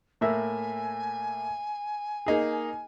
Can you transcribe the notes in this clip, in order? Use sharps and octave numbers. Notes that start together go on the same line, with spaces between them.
A2 A#3 E5 G#5
A#3 D#4 G#4